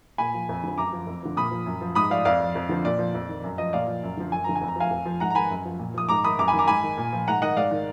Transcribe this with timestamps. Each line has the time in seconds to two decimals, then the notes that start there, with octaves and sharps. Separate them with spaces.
0.18 A#2 G#5 B5
0.34 F3
0.49 F2
0.63 D3 F3
0.78 F#2 A#5 D6
0.93 F3
1.07 F2
1.23 D3 F3
1.36 A#2 B5 D#6
1.51 F3
1.66 F#2
1.81 F3
1.95 G#2 B5 D#6
2.10 F3 D5 F5
2.25 F2 D5 F5
2.40 F3
2.55 F2
2.69 D3 F3
2.85 A#2 D5
2.99 F3
3.14 F2
3.29 D#3
3.44 F#2
3.58 F3 D#5
3.73 A#2 D5 F5
3.87 F3
4.03 F#2
4.17 D3 F3
4.31 F#2 G#5
4.44 D3 F3 A#5
4.55 G#5
4.61 F2
4.68 A#5
4.76 F3 F5 G#5
4.91 F2
5.06 F3
5.20 G#2 F#5 A#5
5.30 A#5
5.35 D#3 G#5 B5
5.51 F#2
5.65 F3
5.79 A#2
5.94 F3 D#6
6.09 G#2 A#5 D6
6.24 D#3 B5 D#6
6.38 F#2 A#5 D6
6.48 G#5 B5
6.53 D#3
6.59 A#5 D6
6.68 G#2 G#5 B5
6.82 D#3
6.97 A#2
7.13 F3
7.28 G#2 F#5 A#5
7.41 D#3 D#5 F#5
7.56 G#2 D5 F5
7.71 D#3